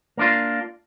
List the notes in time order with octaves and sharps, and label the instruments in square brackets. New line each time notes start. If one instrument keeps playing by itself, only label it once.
[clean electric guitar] A#3 D4 F4